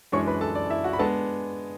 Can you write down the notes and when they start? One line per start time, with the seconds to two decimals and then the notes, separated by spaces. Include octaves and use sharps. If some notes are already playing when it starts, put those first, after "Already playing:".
0.12 F#2 E3 G#3 D4 C#5 C#6
0.27 B4 B5
0.41 A4 A5
0.55 D5
0.70 E4 E5
0.84 F#4 F#5
0.93 B5
0.99 G#3 B3 D4 A4 A5